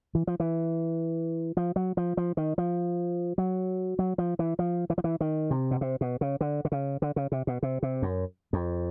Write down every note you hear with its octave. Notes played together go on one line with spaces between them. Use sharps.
E3
F3
E3
F3
F#3
F3
F3
D#3
F3
F#3
F#3
F3
E3
F3
E3
F3
E3
D#3
C3
B2
C3
B2
C#3
D3
D3
C#3
D3
C#3
C3
B2
C3
C3
F#2
F2